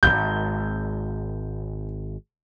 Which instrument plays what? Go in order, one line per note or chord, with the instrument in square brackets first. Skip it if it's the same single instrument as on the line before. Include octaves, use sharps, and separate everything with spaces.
[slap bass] D#1 G#1 [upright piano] G6